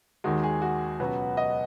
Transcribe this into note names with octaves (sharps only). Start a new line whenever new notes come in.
D#2 D#3 G#3 F#4
G#4
F#4
C#2 B2 F#3 B3
D#5